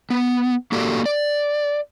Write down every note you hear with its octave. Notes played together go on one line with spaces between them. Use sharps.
B3
A#3 F#4 G4 A4 D5 F5
D5